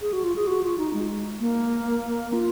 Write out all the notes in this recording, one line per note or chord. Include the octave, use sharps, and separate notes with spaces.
G#4
F#4
F4
G#4
F#4
F4
D#4
G#3
A#3
F4